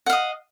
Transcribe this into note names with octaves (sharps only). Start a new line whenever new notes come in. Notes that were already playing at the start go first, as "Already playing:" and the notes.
D#5 F5 F#5